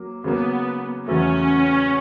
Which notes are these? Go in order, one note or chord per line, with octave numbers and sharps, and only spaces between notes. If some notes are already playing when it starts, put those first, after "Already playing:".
Already playing: F#3 A#3
C#3 F#3 A#3 B3
E2 C#3 F#3 A3 C#4